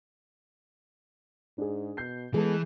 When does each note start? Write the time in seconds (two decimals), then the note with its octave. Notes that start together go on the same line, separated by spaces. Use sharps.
1.58 G#2 D4 G#4
1.97 B2 G6 C7
2.34 E3 G#3 B3 G#4 A4